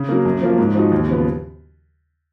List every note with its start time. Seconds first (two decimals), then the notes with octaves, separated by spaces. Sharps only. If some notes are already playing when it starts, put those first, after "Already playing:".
Already playing: C#3
0.09 F#3 A#3
0.25 F#2
0.42 F3 A#3 F4
0.58 G#2
0.75 F3 G#3 D#4 F#4
0.92 D#2
1.08 C#3 F3 B3